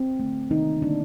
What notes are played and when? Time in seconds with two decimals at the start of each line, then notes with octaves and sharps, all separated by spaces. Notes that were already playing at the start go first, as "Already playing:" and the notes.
Already playing: C4
0.20 D3 A3
0.51 C3 D#3 A#3 D#4
0.82 D3 G3 A#3 D4